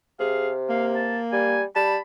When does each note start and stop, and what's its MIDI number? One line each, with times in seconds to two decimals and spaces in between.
0.20 1.21 48
0.20 0.50 68
0.20 0.53 77
0.69 1.61 58
0.69 0.86 77
0.96 1.18 81
1.32 1.65 55
1.32 1.62 80
1.76 1.97 55
1.76 1.98 81
1.76 2.00 83